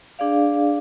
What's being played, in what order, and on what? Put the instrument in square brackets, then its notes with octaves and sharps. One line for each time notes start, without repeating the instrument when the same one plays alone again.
[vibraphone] D4 G#4 D5 F5